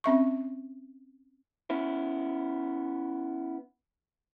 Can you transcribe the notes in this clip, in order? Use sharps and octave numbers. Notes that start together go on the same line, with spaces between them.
C4 C#4 E5 C#6
B3 C#4 E4